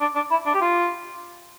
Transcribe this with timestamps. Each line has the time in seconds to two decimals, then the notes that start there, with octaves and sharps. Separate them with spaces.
0.01 D4
0.15 D4
0.31 E4
0.46 D4
0.54 G4
0.61 F4